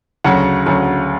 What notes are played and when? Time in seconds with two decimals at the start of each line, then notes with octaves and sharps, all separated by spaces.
0.24 D2 C#3 F#3 F#5
0.66 D2 C#3 F#3